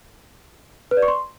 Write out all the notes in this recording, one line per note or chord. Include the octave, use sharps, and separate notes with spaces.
B4
D5
C#6
C6